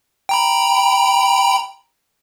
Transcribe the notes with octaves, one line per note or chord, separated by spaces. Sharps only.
G5 A#5 B5